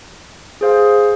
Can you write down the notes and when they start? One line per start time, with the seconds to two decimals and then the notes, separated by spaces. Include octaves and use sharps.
0.61 G#4 C5 F5